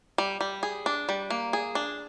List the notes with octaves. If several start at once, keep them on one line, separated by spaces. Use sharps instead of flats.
G3
G3
G#4
D4
G3
A#3
G#4
D4